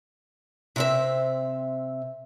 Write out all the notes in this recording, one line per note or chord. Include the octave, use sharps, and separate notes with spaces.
C3 C4 E5